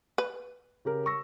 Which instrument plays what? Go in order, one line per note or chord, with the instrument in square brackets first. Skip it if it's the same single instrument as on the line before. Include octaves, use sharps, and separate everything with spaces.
[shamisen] B4
[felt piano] C#3 G4 A#4
C#6 E6 A#6